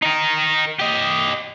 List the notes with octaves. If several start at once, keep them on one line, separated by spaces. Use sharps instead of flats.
D#4 A#4
G4 D#5